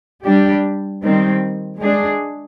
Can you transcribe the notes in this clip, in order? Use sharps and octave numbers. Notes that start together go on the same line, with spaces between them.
G3 D4 G4
D#3 G3 C4
G#3 D4 G#4